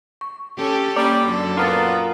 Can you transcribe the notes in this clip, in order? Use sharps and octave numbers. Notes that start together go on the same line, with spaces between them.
C#6
C#4 G4 A4
G3 A#3 C#4 D5
F#2 D3 A4
A#2 B3 F4 A#4 A#5 F6 A6